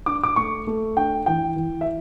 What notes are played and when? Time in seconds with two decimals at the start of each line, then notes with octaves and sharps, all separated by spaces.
0.06 D4 D6
0.23 D6
0.36 A3 C#6
0.67 A3
0.97 D4 G5
1.26 E3 G5
1.56 E3
1.81 E5